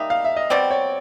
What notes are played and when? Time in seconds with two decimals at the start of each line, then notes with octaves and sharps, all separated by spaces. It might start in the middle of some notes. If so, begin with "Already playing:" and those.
Already playing: G3 A#3 D#4 E5
0.10 F5
0.25 E5
0.37 D#5
0.50 B2 G3 C4 D5
0.71 C#5